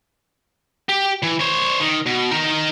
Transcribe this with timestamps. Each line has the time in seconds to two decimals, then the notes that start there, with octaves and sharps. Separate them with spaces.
0.89 G4
1.23 E3
1.41 C5 C#5
1.81 D#3
2.07 B2
2.31 D#4 A#4